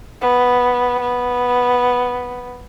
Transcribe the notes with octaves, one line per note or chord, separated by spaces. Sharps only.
B3
B3